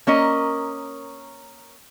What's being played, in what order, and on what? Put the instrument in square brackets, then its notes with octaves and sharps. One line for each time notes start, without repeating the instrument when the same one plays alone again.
[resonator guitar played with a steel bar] A#3 C#4 A#4 D#5